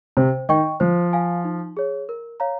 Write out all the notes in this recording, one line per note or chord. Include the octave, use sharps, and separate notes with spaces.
C3 C5
D#3 D#5 G5 C#6
F3 C5
F5 G#5
D#4
G#4 C#5
A#4
C#5 F5 A#5